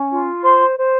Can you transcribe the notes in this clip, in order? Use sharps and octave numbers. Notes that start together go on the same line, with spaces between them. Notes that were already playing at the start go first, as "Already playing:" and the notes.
Already playing: C#4
F4
C5 C6
C5